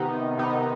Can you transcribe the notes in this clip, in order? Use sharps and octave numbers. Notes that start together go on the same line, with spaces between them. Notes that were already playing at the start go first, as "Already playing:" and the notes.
Already playing: C3 D#3 B3 D#4
C3 D#3 B3 D#4